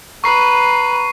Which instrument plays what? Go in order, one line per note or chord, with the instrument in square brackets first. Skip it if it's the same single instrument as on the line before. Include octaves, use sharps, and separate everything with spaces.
[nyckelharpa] B4 [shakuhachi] A#5 [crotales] C#6 C7